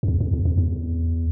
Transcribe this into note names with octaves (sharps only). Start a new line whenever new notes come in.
F2
E2
F2
E2
F2
E2